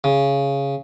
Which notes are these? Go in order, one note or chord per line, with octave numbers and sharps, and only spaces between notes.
C#3